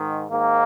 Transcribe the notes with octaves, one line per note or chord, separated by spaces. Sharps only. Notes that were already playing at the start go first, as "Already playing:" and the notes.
Already playing: G#2 D#3
G#2 D#3 A#3